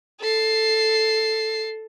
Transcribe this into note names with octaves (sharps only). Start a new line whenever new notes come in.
A4 C7